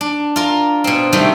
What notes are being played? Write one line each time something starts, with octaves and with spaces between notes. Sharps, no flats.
D4
F4 A#4
B2 C4
C3 D#3 G3 A3